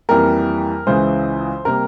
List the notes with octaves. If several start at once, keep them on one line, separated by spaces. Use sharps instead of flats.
F2 E3 G3 A#3 A#4
C#2 C#3 E3 G#3 C5
C3 G3 A#3 A#4